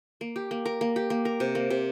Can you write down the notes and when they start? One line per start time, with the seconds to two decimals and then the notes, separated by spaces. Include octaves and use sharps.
0.21 A#3
0.36 G4
0.51 A#3
0.65 A#4
0.81 A#3
0.96 G4
1.10 A#3
1.25 A#4
1.40 C3
1.55 A#3
1.70 C3